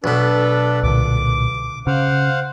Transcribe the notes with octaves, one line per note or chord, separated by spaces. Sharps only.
B1 B2 D4 A4 B4
C2 A#2 D3 D6
C#3 C5 F5 F#5